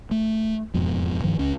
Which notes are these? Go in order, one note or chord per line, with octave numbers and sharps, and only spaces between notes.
A3
E1 F2 G#2 B2
G2 D#3 F3
C#2 C#4